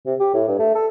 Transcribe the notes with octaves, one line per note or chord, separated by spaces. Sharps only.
C3
G4
A2
G2
A3
A4